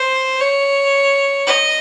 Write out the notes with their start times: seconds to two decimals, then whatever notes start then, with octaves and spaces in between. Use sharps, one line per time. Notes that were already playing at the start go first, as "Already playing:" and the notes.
Already playing: C5
0.40 C#5
1.47 D#5